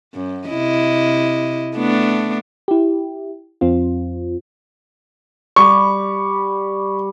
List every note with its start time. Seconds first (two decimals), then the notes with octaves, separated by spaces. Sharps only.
0.14 F#2
0.48 C3 E4 D#5
1.76 A3 B3 D4
2.68 E4 G4
3.61 F2 C4 F4
5.56 G3 C#6